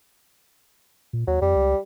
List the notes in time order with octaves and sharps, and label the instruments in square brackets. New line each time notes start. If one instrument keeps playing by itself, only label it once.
[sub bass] A#2
[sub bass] D#2 [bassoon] F#3
[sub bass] F2 [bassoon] G3
[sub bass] C#2